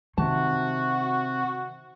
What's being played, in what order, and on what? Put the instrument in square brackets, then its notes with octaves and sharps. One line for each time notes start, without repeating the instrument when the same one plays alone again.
[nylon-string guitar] C3 A5 [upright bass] D#3 [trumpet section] F#4